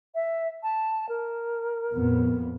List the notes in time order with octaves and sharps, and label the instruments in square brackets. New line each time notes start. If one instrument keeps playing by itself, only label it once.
[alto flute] E5
A5
A#4
[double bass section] F2 A#2 B3